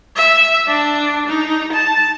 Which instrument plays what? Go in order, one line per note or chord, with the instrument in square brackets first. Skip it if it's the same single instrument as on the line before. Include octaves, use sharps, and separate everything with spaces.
[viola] E5
D4
D#4
A5